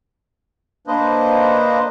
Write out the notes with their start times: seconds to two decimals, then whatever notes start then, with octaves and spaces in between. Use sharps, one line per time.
0.87 A#3 D4 B4 C5 D#5